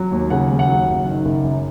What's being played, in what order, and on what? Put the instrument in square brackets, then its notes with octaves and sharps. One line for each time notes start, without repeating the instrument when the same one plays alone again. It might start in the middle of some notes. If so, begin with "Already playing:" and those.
Already playing: [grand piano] F#3
D#2
C#3 F#5
D#2
F#5
F#3
F#1
D#3
F#1
F#2